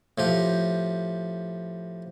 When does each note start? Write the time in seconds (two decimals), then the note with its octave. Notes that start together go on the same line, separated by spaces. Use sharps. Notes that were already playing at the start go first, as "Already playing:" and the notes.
0.18 A2 F3 G4